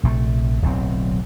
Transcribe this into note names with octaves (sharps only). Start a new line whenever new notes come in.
A#1 C3 G#3 A3
D1 B1 F#3 C4